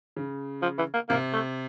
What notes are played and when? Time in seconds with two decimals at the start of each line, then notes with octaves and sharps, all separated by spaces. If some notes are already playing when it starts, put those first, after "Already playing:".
0.16 C#3
0.62 F3
0.78 E3
0.94 A#3
1.09 C3 A#3
1.33 A3